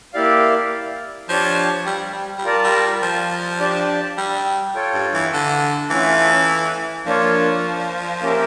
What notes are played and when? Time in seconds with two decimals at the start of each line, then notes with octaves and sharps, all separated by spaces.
0.13 A#3 E4 G4 D5 F5
1.29 F3 D4 G4 C#5 F5 A5
1.87 G3
2.12 G3
2.38 G3
2.44 F4 A#4 D5 A5
2.64 G3
3.03 F3
3.60 D4 G4 D5 A5
4.17 G3
4.75 F4 A4 C#5 G5
4.94 G2
5.14 E3
5.33 D3
5.90 E3 A3 C#4 F4
7.06 F3 A#3 D4 F4 C#5
8.21 A#3 C#4 G4 A#4 E5